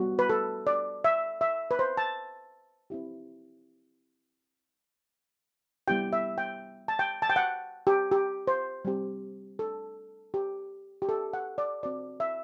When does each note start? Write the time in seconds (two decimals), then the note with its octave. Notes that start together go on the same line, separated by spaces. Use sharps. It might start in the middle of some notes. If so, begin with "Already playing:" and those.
Already playing: G3 B3 F#4
0.19 B4
0.29 A4
0.67 D5
1.04 E5
1.41 E5
1.71 B4
1.79 C5
1.97 A5
2.90 C4 E4 G4
5.88 G3 B3 E4 G4 G5
6.13 E5
6.38 G5
6.88 A5
6.99 G5
7.22 A5
7.30 G5
7.36 F#5
7.87 G4
8.12 G4
8.47 C5
8.85 G3 C4 G4
9.59 A4
10.34 G4
11.02 G4
11.09 A4
11.33 F#5
11.58 D5
11.83 C4 F#4 D5
12.20 E5